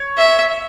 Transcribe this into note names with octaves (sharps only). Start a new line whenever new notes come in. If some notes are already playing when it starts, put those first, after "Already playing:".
Already playing: C#5
E5